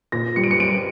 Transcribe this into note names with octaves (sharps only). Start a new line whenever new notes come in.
A#2 A#6
G3 C#7
D7
C#7
G3 D7